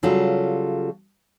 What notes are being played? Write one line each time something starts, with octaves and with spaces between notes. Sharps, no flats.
C#3 F#3 G3 F4 A4